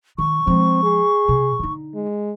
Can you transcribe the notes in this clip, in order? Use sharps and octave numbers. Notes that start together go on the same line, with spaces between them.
D#3 C#6
F3 G#3 C4
G#4
C3
D3 D#4
G#3